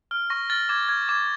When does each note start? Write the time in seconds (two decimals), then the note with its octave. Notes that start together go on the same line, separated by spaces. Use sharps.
0.11 F6
0.30 C#6 A#6
0.50 F6 A6
0.69 D6 G#6
0.89 F6 G#6
1.08 D6 G#6